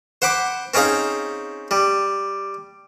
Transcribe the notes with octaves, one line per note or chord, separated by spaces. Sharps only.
C5 F#5 B5 D6
C4 C#4 D#4 G#4 F5
G3